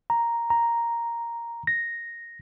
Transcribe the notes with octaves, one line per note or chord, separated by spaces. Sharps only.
A#5
A#5
A#6